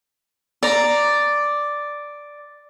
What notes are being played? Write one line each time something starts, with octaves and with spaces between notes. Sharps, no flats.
D5 A#5